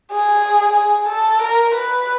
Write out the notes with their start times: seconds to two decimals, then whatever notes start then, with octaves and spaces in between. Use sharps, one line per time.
0.12 G#4
0.77 G#4
1.08 A4
1.42 A#4
1.74 B4